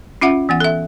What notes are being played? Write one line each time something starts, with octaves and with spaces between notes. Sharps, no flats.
C#4 F4 E5 F#5
E3 B3 F#5
A4 E5